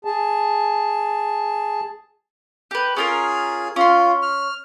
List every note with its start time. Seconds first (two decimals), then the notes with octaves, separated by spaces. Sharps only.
0.05 G#4 A5
2.71 G4 B4
2.97 C#4 F4 G#4 A#4
3.76 C#4 F4 C6
4.22 F6